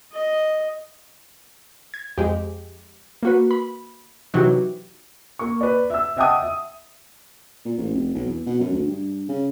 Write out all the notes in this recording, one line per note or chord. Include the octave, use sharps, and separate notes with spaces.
D#5
G#6
F2 G#3 G4
A#3 F#4 B4
B5
C3 E3 F#3 D#4 F#4 G4
A#3 C#6
B4 D5
E5 E6
D#5 E5 F#5 G5 A5 D#6
E5
A#2
A1
F1
B1
E2
B2
F#2
D2
G2
C#3